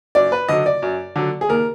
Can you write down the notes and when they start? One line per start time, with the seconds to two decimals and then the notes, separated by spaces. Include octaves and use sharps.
0.15 F#2 D5
0.32 B4
0.49 D3 F#3 D#5
0.66 D5
0.82 F#2
1.16 D3 F#3
1.41 G#4
1.49 D#2 A#4